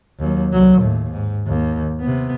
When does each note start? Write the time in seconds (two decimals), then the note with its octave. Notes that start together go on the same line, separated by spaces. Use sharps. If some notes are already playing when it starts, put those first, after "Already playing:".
0.19 D#2 F#3
0.52 C2 F#3
0.81 D#2 A2
1.11 G#2
1.47 D#2
2.01 C3 B3